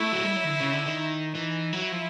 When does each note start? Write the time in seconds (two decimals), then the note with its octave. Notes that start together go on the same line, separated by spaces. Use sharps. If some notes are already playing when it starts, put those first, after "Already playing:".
Already playing: A3 E4
0.12 F#3
0.23 G3
0.36 F#3
0.44 D#3
0.48 D3
0.60 C#3
0.73 D3
0.86 D#3
0.98 D#4
1.35 E3 D#4
1.73 F#3 E4
1.92 F3